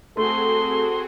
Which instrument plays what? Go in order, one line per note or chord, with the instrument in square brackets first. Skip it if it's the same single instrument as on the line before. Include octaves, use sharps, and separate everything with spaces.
[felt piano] A3 [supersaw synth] C4 F#4 G#4 [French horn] A4 [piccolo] C6